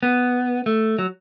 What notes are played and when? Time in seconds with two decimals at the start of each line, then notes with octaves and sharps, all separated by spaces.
0.03 B3
0.66 A3
0.99 F#3